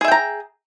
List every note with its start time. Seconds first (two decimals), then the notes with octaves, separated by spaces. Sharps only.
0.01 G#4
0.05 E5
0.08 G5
0.12 A#5